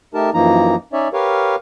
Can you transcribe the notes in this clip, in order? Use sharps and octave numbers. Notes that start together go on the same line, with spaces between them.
A3 D#4 G4 A#4 A5
F#2 E3 F3 A#3 D#4 A#5
C#4 D#4 C#5 D5 E5
G4 A#4 B4 C#5 F5